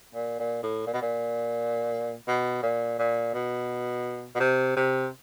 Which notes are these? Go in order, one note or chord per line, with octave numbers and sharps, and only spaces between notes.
A#2
A#2
A2
A#2
B2
A#2
B2
A#2
A#2
B2
B2
C3
C3